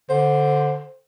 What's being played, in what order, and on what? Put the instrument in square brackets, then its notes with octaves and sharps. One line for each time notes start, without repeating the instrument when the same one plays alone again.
[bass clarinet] D3 [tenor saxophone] C5